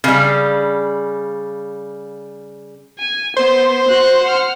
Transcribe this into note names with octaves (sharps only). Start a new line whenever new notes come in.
C#3 G3
G#5
B3 C5
F#4 F#6
F#5 F6